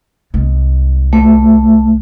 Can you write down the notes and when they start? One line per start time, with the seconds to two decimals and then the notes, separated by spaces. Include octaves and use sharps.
0.34 C2 G#3
1.13 A3